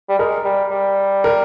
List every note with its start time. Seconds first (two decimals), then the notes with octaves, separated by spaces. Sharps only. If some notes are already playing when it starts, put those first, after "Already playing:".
0.09 G3
0.18 G#3 A#4
0.45 G3
0.71 G3
1.24 A#4